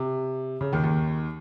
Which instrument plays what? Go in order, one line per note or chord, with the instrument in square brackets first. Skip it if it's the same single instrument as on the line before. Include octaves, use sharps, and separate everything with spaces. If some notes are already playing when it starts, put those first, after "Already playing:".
Already playing: [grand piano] C3
C#3
D#2 D#3
D#2 D#3